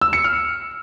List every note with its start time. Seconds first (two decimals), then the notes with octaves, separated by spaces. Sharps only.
0.01 E6
0.13 C#7
0.24 F6